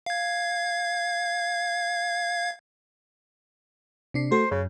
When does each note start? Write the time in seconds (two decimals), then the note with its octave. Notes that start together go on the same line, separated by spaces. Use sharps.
0.06 F5 G#6
4.14 C3 D4 C7
4.32 A3 F#4 A4 C5
4.51 F#2 C#3